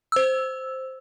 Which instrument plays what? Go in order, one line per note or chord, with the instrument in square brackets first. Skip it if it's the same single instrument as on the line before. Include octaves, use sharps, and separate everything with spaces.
[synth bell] C5 E6